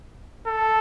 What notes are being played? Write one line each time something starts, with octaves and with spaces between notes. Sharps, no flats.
A4